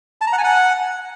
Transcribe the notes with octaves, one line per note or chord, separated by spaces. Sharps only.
A5
A#5
F#5
G#5
F#5